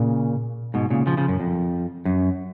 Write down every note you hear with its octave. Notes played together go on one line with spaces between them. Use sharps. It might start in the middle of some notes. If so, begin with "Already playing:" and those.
Already playing: A#2 C#3
G#2 B2
A#2 C#3
C#3 F3
C#3 F3
F#2
F2
F#2